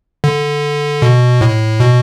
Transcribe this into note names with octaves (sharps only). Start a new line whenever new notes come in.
D3
B2
A2
B2